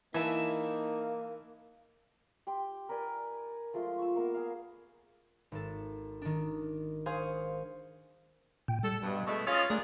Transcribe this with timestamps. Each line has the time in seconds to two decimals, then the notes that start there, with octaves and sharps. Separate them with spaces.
0.14 E3 A#3 D#4 E5 A5
2.47 G4 G5 C6
2.89 A#4 B4 D5 G#5
3.74 F3 G#3 A3 F4
3.98 C#6 E6
4.16 A#3 B3 A#4
4.34 G#4 F5
5.52 G#1 A4
6.22 D#3 D4
7.06 G#4 C5 F5 G#5 C6 C#6
8.68 A#2 G5
8.83 G3 A4
9.03 G2 B2
9.27 B2 G#3 A3
9.47 C#4 F4 D#6 A6
9.70 A3 A#3 D4 G#4